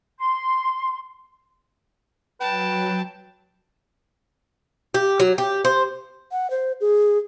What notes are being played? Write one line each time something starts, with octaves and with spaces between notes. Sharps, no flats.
C6
F#3 B4 G5 A5
G4
F#3
G4
C5
F#5
C5
G#4